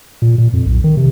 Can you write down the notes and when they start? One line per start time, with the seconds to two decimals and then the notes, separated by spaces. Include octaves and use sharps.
0.22 A#2
0.38 A#2
0.53 F2
0.66 B1
0.84 D#3
0.97 C3